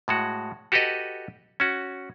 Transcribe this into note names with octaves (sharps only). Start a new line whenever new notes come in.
A2 G#3 F#4
F#4 G4 A4 B4 D#5
C#4 F#4